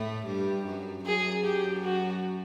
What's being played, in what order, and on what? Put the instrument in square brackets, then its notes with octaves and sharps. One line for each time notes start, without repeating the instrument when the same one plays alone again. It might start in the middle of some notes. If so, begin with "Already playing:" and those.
Already playing: [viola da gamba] A2 A3
G2 G3
F#2 F#3
[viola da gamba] F#2 F#3 [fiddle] G#4
[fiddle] G4
F#4